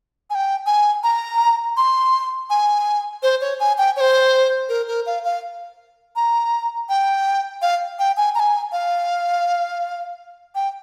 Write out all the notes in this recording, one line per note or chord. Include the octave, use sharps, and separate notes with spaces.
G#5
G5
G#5
A#5
C6
G#5
C5
C#5
G#5
G5
C#5
C5
A#4
A#4
F5
F5
A#5
G5
F5
G5
G#5
A#5
G#5
F5
G5